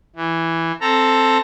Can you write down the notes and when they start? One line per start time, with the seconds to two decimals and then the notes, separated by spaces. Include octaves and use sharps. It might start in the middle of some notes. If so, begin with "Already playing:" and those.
0.16 E3
0.81 C4 A4 A#5